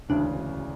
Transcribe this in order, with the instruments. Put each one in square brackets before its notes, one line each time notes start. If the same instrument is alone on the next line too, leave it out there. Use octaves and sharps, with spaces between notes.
[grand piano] E1 D2 C#3 E3 [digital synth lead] D4